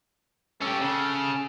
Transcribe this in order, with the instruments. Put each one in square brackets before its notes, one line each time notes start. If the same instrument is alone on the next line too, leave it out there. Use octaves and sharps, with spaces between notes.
[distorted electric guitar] C#4 G4 [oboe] A4
[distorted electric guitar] C#3